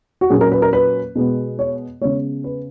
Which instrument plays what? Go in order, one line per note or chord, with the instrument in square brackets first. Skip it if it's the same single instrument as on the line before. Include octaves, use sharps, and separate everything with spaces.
[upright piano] F#4
A#2 F#3 A#3 C#4 G#4
A#4
B4
A#4
B4
B2 G#3 B3
C#5
C#3 G#3 B3 C#5
B4